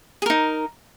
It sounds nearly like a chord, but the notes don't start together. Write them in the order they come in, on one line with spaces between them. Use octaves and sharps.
G#4 A#4 D#4